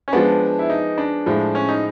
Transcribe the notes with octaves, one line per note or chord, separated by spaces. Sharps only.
C#4
F3 G#3 B3 D4
E4
D#4
D4
A2 F3 G#3
C#4
D#4